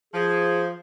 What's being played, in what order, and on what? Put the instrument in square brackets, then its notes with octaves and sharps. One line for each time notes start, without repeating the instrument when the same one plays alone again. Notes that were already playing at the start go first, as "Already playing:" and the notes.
[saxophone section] F3 [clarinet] G#4